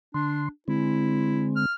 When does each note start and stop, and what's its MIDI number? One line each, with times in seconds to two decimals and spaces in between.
0.14 0.48 50
0.14 0.49 62
0.14 0.48 84
0.68 1.65 50
0.68 1.65 56
0.68 1.65 60
0.68 1.49 64
1.56 1.74 89